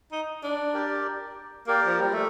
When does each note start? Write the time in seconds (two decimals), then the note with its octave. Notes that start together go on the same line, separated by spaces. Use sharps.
0.12 D#4
0.44 D4
0.74 G4 A#4 D5 G5
1.67 A#3 G4 A#4 D5 G5
1.87 F3
2.00 G3
2.14 A3